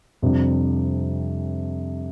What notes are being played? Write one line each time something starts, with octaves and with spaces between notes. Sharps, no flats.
F2 C3 G3 D4